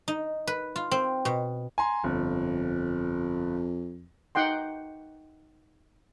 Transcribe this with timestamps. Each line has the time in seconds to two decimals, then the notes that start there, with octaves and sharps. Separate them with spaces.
0.08 D#4
0.47 B4
0.76 F4
0.91 C4
1.25 B2
1.78 G#5 A#5 C6
2.04 G1 F2
4.35 D#4 F#5 G5 C6